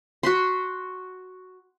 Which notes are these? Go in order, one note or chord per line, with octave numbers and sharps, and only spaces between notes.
F#4 B5 C6